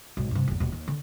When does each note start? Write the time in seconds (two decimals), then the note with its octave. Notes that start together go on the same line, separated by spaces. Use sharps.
0.17 B1 G#2
0.31 G2 C3
0.48 G1 E2
0.60 D#1 B2
0.72 D#2
0.88 D3